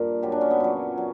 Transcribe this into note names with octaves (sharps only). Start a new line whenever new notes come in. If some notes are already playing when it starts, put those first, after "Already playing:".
Already playing: G2 A#2 A#4
F#2 C#3 F#3 G4
D4
C#4
B3
A#2 F#3
F#3